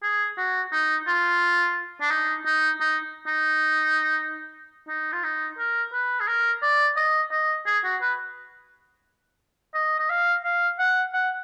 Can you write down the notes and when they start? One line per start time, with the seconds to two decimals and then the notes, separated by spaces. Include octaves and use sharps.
0.03 G#4
0.38 F#4
0.72 D#4
1.07 F4
2.01 D4
2.11 D#4
2.46 D#4
2.81 D#4
3.27 D#4
4.88 D#4
5.13 F4
5.24 D#4
5.58 A#4
5.93 B4
6.20 G#4
6.28 A#4
6.62 D5
6.97 D#5
7.32 D#5
7.67 G#4
7.84 F#4
8.01 B4
9.74 D#5
9.99 D#5
10.10 F5
10.44 F5
10.79 F#5
11.14 F#5